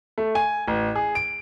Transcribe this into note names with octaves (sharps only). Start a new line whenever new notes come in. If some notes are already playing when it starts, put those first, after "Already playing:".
A3
G#5
A1
G#4
D7